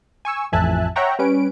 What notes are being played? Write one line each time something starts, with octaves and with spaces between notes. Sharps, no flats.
G#5 C#6 E6
A1 F2 E5 G#5 A5 F#6
C#5 E5 F#5 G5 A#5 C#6
G3 C#4 B4 D7